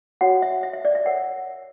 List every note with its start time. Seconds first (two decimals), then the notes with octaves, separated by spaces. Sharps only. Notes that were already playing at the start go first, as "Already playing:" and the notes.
0.21 F#4 C#5 F#5
0.42 E5
0.63 E5
0.73 E5
0.85 D5
0.95 E5
1.05 A#4 C#5 F#5